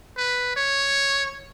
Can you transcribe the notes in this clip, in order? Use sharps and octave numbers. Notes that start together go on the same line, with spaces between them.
B4
C#5